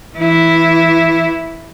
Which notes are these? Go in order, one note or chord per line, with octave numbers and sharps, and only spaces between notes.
E3 E4